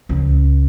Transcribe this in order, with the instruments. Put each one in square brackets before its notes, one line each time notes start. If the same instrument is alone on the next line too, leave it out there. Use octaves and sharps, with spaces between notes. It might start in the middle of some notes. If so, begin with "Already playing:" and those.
[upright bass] C#2